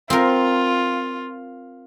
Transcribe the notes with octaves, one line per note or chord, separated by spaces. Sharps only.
C4 F4 A#4